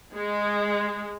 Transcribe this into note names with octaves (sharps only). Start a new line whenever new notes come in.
G#3